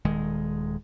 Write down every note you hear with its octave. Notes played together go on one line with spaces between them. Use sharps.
D#1 D#3 G#3